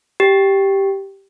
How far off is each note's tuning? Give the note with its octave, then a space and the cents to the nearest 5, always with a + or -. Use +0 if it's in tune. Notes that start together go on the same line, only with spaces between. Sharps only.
G4 -5